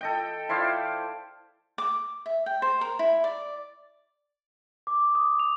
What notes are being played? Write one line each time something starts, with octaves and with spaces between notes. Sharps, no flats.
A4 D#5 G5
E4 C5 D5 F5
D6
E5
G5
C5
A#4
E4
D5
D6
D#6
F7